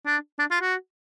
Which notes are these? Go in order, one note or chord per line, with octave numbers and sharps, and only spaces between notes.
D4
D4
F4
F#4